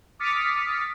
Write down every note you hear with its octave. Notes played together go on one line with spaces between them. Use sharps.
D6 D#6 F6 A6 B6 C#7